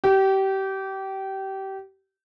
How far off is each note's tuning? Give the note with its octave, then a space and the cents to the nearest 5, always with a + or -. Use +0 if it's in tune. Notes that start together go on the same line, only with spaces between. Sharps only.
G4 -25